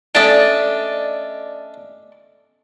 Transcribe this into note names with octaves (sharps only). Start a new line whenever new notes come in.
A3 C#4 D4 D5 D#5